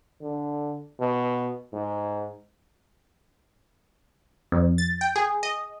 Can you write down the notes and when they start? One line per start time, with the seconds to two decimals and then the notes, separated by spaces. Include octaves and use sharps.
0.22 D3
0.99 B2
1.72 G#2
4.52 F2
4.78 A6
5.01 G5
5.16 G#4
5.43 D#5